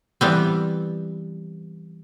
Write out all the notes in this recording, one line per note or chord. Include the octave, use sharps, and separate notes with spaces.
E3 G3 B3 C4